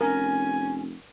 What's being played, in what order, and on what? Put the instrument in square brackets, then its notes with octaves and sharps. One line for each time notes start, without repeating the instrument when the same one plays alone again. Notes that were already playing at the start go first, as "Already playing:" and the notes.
[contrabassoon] F1 [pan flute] C#4 [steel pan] A#4 [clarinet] G#5